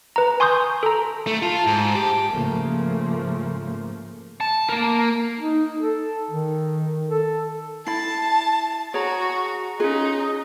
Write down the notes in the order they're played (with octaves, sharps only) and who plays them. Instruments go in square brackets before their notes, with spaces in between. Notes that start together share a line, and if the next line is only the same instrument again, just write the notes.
[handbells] B4 A#5
G#5 C6 C#6 D#6 G6
A4 A#5
[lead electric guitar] A3
[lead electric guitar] F4 [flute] A5
[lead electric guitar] G#2
G4
[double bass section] G#2 C#3 F3 A3 A#3
[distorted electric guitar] A5
A#3 A#4
[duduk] D#4
A4
D#3
A4
[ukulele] E4 B5 [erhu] A5 [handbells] A6 C7
[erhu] F#4 [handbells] G#4 A#5 [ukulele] C#5
[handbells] C#4 F4 [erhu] D#4 [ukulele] G#4